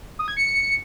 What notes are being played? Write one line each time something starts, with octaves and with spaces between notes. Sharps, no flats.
D#6
G#6
C#7